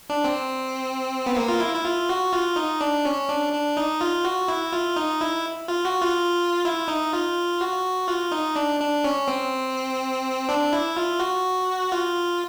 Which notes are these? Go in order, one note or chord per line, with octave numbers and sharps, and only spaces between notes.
D4
C4
B3
A#3
F4
E4
E4
F4
F#4
F4
D#4
D4
C#4
D4
D4
D#4
F4
F#4
E4
F4
D#4
E4
F4
F#4
F4
E4
D#4
F4
F#4
F4
D#4
D4
D4
C#4
C4
D4
E4
F4
F#4
F4